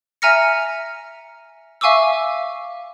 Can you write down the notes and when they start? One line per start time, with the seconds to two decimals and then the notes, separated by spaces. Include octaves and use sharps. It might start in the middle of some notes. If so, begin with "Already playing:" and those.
0.22 E5 G#5 A#5 F6 A#6 C#7
1.81 E5 F5 G#5 C#6 D6 E6